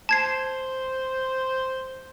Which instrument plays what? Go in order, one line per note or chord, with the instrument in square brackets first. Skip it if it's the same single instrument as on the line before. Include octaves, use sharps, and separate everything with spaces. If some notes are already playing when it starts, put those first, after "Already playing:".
[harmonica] C5 [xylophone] A5 G#6 C7